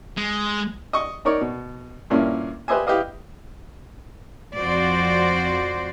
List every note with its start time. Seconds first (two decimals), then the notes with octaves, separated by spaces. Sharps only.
0.17 G#3
0.93 D#5 C#6
1.25 D#4 A#4 C#5 D5
1.41 B2
2.10 G2 A#2 A#3 C#4 E4
2.68 G4 B4 C5 D#5 E5 G#5
2.87 E4 G4 B4 D#5 F5
4.57 F2 F#4 C5 D5